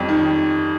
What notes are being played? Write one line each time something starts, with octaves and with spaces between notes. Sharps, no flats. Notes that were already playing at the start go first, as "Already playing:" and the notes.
Already playing: F2 G3 C#4
D#3